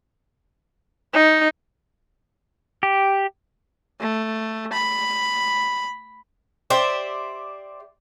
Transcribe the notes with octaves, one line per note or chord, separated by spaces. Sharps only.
D#4
G4
A3
B5
G4 C5 D5 E5